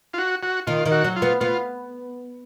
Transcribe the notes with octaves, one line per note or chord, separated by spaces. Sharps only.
F4
F#4
F#4
D#3 F4
D#3
F#4
F#3
F4
B3
B3 F4